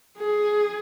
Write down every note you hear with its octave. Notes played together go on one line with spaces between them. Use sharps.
G#4